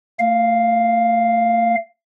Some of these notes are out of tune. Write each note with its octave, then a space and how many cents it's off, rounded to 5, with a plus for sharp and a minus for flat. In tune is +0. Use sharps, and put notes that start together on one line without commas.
A3 +35 F5 +0